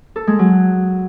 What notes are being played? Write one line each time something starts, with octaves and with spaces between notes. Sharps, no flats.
A4
G#3
F#3